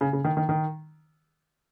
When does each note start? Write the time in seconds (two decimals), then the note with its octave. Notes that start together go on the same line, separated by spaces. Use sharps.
0.01 C#3
0.13 C#3
0.25 D#3
0.37 D#3
0.49 D#3